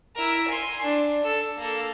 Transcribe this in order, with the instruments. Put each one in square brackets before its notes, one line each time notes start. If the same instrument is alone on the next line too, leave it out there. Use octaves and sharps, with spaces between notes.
[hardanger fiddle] E4 A#4
G#5 C6
D4
A4
A#3 A4